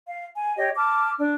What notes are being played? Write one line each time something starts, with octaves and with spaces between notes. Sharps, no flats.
F5
G#5
G4 C#5 D#5
A5 D6 F6
D4